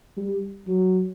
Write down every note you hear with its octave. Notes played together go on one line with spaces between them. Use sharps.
G3
F#3